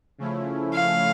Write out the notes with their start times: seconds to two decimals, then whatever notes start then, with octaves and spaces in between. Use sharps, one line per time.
0.18 C#3 F3 A3 C#4 E4
0.74 F5